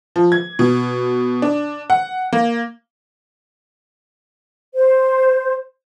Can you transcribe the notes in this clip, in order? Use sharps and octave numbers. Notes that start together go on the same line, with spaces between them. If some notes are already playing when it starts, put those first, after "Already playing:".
F3
G#6
B2
D4
F#5
A#3
C5